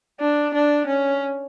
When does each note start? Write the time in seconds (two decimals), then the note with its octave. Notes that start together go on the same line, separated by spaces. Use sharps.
0.20 D4
0.55 D4
0.87 C#4